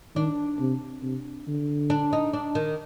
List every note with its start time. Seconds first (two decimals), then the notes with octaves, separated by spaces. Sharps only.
0.16 D#3 D4
0.60 C3
1.03 C3
1.47 D3
1.90 D4
2.13 D#4
2.33 D4
2.55 D#3